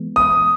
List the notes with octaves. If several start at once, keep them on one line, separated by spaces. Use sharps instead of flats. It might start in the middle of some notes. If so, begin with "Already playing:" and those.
Already playing: E3 G#3 B3
D#6